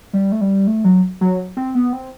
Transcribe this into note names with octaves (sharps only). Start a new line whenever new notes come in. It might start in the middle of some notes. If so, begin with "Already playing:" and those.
G3
A3
G3
A3
F#3
F#3
C4
B3
C4